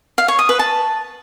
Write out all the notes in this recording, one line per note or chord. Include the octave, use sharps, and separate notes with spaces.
F5
C#5
D#6
B4
A5